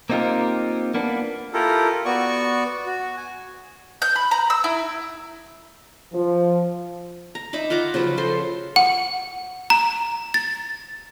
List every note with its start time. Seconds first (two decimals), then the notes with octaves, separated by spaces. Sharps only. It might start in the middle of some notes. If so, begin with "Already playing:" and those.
0.10 A#3 C4 D#4 F4 G4 A#4
0.94 A#3 B3 D4
1.53 E4 F4 G4 A4 A#4
2.05 B3 F#4 D5 C#6
2.86 F#4
3.17 G#5
4.02 G6
4.16 B5
4.31 A#5
4.50 E6
4.64 E4
6.13 F3
7.35 A#5
7.53 D#4 E5 B5 D6
7.70 F4 F#5 A#5 D6
7.94 C#3 F3 F#3 B4
8.17 F3 A4 C5 C6
8.76 F#5
9.70 A#5
10.34 A6